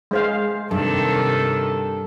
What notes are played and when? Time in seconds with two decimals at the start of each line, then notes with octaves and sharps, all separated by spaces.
0.11 G#3 C5 F5
0.71 G2 C3 D#3 A4